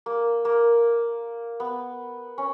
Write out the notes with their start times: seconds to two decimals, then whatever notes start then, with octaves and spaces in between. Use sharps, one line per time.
0.06 A#3
0.45 A#3
1.60 B3
2.38 C#4